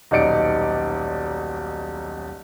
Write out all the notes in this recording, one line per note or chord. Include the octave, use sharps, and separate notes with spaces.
D#1 B1 D#4 D5 C#7 D7